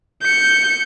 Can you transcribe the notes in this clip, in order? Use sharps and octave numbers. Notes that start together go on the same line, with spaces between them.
G6 C#7